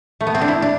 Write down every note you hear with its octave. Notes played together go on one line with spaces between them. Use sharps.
A3
B3
C4
D4
E4
D4